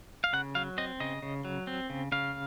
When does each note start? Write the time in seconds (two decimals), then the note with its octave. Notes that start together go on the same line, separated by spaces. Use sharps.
0.24 F5
0.33 C#3 F#5
0.55 F#3 F5
0.78 C4 D#5
1.00 C#3 D#5
1.23 C#3
1.45 F#3
1.67 C4
1.90 C#3
2.12 C#3 F5